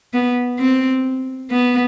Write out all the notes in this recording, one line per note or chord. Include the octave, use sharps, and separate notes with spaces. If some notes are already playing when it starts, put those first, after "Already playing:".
B3
C4
B3